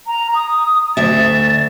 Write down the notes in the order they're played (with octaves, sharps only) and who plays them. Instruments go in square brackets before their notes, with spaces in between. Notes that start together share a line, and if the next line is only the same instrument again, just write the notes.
[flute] A#5
D#6
[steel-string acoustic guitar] D2 E5 [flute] A6